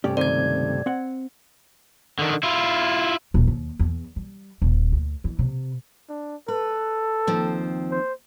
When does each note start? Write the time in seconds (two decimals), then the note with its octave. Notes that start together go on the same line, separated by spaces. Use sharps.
0.04 G2 C3 A3 C#4 G4 D5
0.17 C#2 D#3 C4 D5 G#6
0.86 C4 F#5
2.19 D3 D#3
2.43 E4 F4
3.34 D#1
3.47 D#2
3.79 E2
4.16 G3
4.62 D#1
4.92 D2
5.24 E3
5.39 C3
6.09 D4
6.48 A4 B4
7.27 D#2 F3 C4
7.91 C5